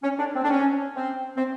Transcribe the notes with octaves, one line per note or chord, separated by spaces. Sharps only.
C#4
D4
C4
D4
C#4
C4
C4